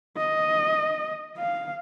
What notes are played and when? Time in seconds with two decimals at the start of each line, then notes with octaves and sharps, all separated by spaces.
0.17 D#5
1.37 F5